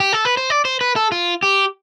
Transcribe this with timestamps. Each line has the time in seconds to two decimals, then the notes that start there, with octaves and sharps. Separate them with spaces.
0.00 G4
0.13 A4
0.25 B4
0.37 C5
0.50 D5
0.65 C5
0.81 B4
0.96 A4
1.12 F4
1.43 G4